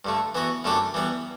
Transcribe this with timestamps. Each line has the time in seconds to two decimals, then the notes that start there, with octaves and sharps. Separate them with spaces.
0.05 G2 D3 A3
0.35 E3 B3 F#4
0.64 F#2 D3 A3 D4 G4
0.94 E3 G3 B3